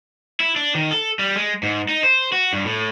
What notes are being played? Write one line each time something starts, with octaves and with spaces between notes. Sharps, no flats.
E4
D4
D#3
A4
G3
G#3
G#2
D#4
C5
F#4
G2
A2